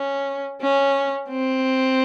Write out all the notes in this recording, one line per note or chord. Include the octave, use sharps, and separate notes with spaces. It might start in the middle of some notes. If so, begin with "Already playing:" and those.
Already playing: C#4
C#4
C4